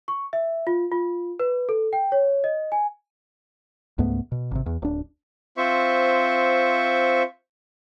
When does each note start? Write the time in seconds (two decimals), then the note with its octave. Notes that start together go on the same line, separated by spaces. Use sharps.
0.08 C#6
0.33 E5
0.67 F4
0.92 F4
1.40 B4
1.69 A4
1.93 G5
2.12 C#5
2.44 D#5
2.72 G#5
3.98 C#2 G#2 A3 B3
4.32 B2
4.51 G#1 C3
4.66 E2
4.82 D1 D4
5.57 C4 F4 C5 E5 C#6